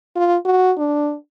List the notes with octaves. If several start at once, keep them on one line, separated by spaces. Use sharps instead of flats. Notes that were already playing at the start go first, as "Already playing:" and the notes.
F4
F#4
D4